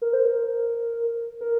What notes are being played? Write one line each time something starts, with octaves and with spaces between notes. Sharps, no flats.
A#4
C5
A#4
A#4